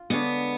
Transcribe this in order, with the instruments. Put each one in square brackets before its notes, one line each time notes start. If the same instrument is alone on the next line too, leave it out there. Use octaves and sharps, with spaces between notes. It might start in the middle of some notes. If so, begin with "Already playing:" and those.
Already playing: [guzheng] F4
[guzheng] D3 G#3 D4 G#4 C#5 [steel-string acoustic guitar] B3